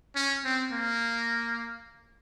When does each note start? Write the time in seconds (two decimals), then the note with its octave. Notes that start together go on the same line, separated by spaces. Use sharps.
0.16 C#4
0.44 C4
0.72 A#3